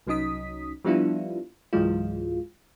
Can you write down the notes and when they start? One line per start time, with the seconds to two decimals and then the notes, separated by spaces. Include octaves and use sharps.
0.07 C2 F#3 C#4 D#4 D#6 B6
0.85 F3 G3 B3 D4 E4 F4
1.73 C#2 G#2 E3 F#3 G#3 F4